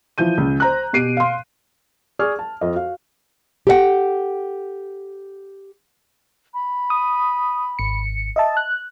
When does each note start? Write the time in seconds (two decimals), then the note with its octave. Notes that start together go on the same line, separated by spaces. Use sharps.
0.18 E3 F3 G6 D#7
0.38 C#2
0.60 C5 A#5 F#6
0.93 B2 G4 C7 D7 D#7
1.17 F5 C6
2.19 G#4 D5 C#6 F6
2.39 A5
2.61 F2 D#5
2.74 F#4 F5
3.67 G4 A4 B4 E5 F#5 G5
6.54 B5
6.90 D#6
7.79 G#1 C#7
8.36 D#5 E5 A5
8.57 F#6